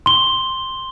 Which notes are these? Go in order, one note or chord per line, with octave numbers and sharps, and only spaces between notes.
C6 G7